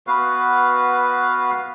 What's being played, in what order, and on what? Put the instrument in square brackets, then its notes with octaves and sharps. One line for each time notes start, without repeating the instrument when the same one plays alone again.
[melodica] B3 F#4 B4 F5